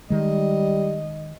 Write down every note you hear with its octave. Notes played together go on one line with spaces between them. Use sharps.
D#3 G3 G#3 D#5